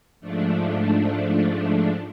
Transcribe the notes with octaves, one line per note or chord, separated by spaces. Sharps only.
G#2 F3 A3 D4